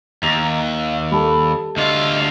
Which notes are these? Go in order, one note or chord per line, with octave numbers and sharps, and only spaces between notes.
D#2 A#5 F7
F5
G3 A4 B5
D2 F4 D#5